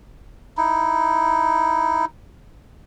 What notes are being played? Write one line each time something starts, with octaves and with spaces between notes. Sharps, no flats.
D#4 E4